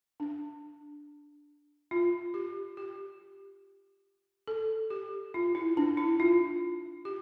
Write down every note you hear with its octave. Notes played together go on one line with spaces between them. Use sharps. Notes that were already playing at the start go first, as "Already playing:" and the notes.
D4
F4
G4
G4
A4
G4
F4
E4
D4
E4
F4
G4